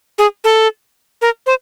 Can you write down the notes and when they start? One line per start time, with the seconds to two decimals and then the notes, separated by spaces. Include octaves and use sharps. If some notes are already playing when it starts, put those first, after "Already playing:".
0.18 G#4
0.44 A4
1.22 A#4
1.46 C5